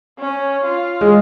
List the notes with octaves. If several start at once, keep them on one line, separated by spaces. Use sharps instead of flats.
C#4
F4
G#3